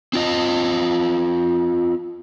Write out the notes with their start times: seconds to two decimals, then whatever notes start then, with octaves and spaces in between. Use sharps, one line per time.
0.13 C4 F4 D#5